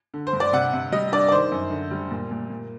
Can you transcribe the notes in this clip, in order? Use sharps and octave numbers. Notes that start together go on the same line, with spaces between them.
D3
C5
G2
D5
C3 F#5
C3
G3 D#5
D4 D5
D5
D#3 C5
F#2
D3
G3
A#2
A#2
A#2